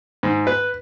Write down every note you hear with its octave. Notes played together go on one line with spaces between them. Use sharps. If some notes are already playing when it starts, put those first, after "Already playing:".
G#2
B4